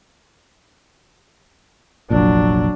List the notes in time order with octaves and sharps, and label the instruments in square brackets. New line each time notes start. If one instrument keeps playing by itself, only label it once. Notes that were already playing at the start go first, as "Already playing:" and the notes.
[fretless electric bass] F1 A#1 A#2 [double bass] F#3 D4